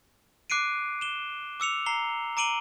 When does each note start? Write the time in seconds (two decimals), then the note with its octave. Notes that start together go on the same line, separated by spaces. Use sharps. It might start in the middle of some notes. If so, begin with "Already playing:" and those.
0.50 D6 F#6 C7 D7 D#7
1.01 E7 G7
1.60 D6 E6 C#7 F7
1.86 A#5 C7 G7
2.37 A#5 D6 D7 D#7 F#7 G7